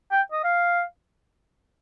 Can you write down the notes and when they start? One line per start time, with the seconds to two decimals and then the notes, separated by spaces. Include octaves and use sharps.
0.11 G5
0.32 D#5
0.44 F5